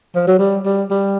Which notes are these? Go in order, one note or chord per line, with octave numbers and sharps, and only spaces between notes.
F3
F#3
G3
G3
G3